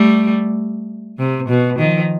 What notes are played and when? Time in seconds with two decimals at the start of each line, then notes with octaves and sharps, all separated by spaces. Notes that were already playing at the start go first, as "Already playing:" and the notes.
Already playing: G3 A3
1.19 C3
1.49 B2
1.78 D#3 F3